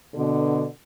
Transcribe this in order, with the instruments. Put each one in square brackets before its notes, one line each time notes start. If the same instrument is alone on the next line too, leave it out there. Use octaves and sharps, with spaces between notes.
[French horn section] B2 D3